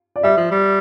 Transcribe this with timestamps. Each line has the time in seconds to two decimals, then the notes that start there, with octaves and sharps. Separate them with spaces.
0.16 D5
0.23 G3 E5
0.37 F3
0.51 G3